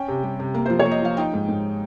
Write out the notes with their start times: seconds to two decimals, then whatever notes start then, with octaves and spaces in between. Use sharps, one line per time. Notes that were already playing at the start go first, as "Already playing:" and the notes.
Already playing: C#4 G5
0.08 C3
0.23 G3
0.40 C3
0.54 A#3
0.66 F3 C5
0.79 C#5
0.85 A#3
0.91 D#5
1.02 F3 F5
1.17 D#4 G5
1.33 G#2
1.49 G#2